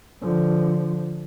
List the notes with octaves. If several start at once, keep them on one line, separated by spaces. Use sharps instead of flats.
D3 F3